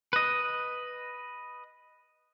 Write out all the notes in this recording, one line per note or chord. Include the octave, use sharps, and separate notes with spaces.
B4 D#5